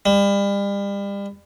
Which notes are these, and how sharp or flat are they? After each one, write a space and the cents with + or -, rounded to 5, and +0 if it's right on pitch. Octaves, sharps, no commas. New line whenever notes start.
G3 +35